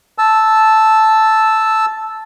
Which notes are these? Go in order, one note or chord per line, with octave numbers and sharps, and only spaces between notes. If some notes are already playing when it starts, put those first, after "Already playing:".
A5 E6